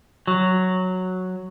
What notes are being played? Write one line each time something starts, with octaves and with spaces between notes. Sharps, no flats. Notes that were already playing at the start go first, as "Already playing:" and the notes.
F#3